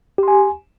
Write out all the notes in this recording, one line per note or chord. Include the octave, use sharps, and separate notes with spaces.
G4 G#5 C6